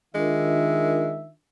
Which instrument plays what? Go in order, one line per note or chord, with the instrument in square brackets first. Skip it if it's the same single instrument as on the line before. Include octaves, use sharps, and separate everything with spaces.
[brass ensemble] D#3 E5 [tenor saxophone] G#3 [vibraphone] D4 F4 A#4